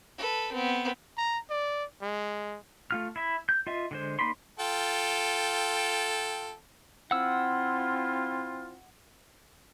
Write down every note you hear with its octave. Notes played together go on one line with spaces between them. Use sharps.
A4 B4
B3 C4
A#5
D5
G#3
A3 F4 F6
E4 E5
G6
F4 D#5 E5
D3 G#3 C5
A#3 D#4 D5 B5 C6
F4 A4 G5
C4 E4 F4 F#5 E6